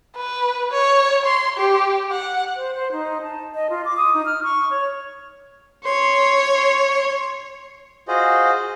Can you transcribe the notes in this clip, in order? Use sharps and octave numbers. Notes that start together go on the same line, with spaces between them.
B4
C#5
C6
G4
F#5
C5
C5
D#4
A5
D#5
F4
D6
D#6
D#4
F6
C#6
C#5
C#5 C6
F4 F#4 G#4 C5 D#5